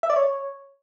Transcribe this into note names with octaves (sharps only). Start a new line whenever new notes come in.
E5
D5
C#5